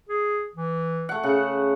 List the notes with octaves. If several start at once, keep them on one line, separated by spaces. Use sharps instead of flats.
G#4
E3
A3 F#5
C#3 F#5